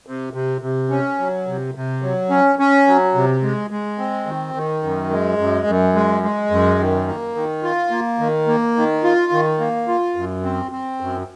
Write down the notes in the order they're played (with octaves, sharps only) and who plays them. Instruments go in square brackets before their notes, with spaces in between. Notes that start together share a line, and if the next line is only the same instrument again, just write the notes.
[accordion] C3
C3
C3
C#4
F#3
C3
C3
F#3
C#4
C#4
F#3
C3
G#3
G#3
C4
D#3
D#3
F#2
G#3
F#2
F#2
G#3
G#3
F#2
D#3
A#3
D#3
F4
A#3
D#3
A#3
D#3
F4
D#3
A#3
F4
F#2
C4
C4
F#2